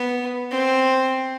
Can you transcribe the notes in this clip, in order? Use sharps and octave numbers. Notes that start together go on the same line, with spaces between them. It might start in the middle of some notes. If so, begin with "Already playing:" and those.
Already playing: B3
C4